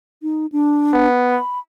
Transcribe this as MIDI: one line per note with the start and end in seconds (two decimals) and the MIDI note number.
0.22 0.46 63
0.52 1.06 62
0.93 1.38 59
1.30 1.59 83